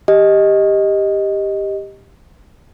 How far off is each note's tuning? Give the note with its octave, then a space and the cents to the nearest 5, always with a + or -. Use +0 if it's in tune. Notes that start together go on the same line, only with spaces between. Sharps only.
G4 +10 D#5 +0